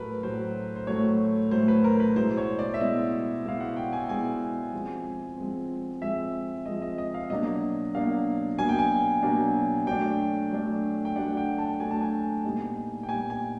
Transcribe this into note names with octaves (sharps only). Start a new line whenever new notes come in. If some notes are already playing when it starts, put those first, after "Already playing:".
Already playing: A2 F#3 A3 A#4 B4
A2 F#3 A3 C5
C5
A2 F#3 A3 C#5
A2 F#3 A3 C5
B4
A#4
B4
B2 G#3 B3 E4 C5
C#5
D5
E5
B2 G#3 B3 E4 D#5
B2 G#3 B3 E4 F5
F#5
G5
G#5
B2 G#3 B3 E4 G#5
F3 G#3 C4
F3 G#3 C4
F3 G#3 C4 E5
F3 G#3 C4 D#5
D#5
D#5
F5
B2 F#3 A#3 D4 D#5
B2 F#3 A#3 D4 F5
B2 F#3 A#3 D4 G#5
G5
G#5
B2 F#3 A#3 D4
F#3 A3 D4 G5
F#3 A3 D4
G5
F#3 A3 D4 F#5
G5
A5
F#3 A3 D4 G#5
A5
G#5
A#2 G3 B3 D#4
G5
A#2 G3 B3 D#4 G#5
G#5